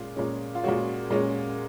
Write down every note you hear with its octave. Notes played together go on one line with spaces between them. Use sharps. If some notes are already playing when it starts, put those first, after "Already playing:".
Already playing: A#2 G#3 C#4 F4
A#2 G#3 C#4
F4
A#2 G#3 C#4 F#4
A#2 G#3 C#4